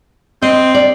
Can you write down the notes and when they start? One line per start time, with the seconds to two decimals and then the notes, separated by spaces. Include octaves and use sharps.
0.42 C4 D#5
0.75 D5